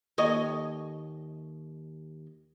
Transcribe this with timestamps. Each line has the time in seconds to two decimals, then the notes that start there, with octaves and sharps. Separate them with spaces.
0.18 D#2 C#5 D#5